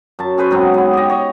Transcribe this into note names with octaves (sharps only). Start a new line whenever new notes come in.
F#2 A5
C#4 G#4 B4 C5
G#2 F#3 B3 C4
B3 C4
G4 D#5
C#5 D#5